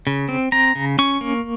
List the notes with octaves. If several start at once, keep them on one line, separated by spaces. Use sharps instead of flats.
C#3
C4
C4 A#5
C#3
C#4 C#6
A#3